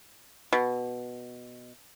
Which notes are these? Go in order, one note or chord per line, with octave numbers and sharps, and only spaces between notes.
B2